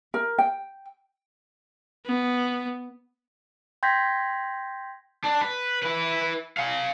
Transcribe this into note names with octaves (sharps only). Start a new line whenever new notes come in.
A#4
G5
B3
G5 C6 G6 G#6 A#6 B6
D4
B4
E4 B4
F5 G#5